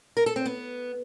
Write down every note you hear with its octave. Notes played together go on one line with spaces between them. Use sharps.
A#4
A4
C4
B3